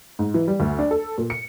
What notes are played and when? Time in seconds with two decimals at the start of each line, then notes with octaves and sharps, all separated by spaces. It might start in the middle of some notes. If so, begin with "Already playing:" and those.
0.19 G#2
0.34 E3
0.48 G3
0.60 D2
0.79 D4
0.91 A4
1.18 A#2
1.30 C#7